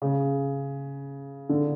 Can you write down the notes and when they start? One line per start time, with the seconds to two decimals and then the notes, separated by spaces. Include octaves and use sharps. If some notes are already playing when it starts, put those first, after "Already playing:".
0.02 C#3
1.49 D3